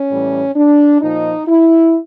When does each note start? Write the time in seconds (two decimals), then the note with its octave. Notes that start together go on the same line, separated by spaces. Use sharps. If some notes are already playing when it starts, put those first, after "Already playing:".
Already playing: C#4
0.10 A2 E3 G3
0.56 D4
1.02 A#2 F3 D#4
1.48 E4